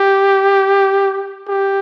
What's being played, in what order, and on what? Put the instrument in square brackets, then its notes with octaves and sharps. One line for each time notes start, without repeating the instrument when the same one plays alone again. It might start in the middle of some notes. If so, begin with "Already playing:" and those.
Already playing: [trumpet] G4
G4